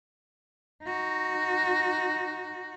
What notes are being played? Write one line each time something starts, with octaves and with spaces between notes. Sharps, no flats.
D#4 F#4